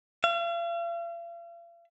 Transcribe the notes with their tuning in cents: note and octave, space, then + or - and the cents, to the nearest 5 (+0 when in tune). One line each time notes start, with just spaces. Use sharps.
F5 -40